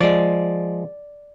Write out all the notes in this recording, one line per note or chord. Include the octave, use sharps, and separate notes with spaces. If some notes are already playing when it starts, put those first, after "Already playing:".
F3 G#3 D5